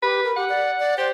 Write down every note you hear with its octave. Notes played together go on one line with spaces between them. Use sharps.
G4 B4
A#4
G4 F#5
D5
D5
G4 C5